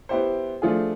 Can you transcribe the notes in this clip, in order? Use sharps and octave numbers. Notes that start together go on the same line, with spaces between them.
B3 E4 G4 C5
F3 A3 D4 F4 G#4